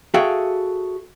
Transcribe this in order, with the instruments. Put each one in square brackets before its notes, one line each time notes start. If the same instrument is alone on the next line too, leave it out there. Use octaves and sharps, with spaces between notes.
[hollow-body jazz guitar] F#4 G#4 A4 E5 F5 G5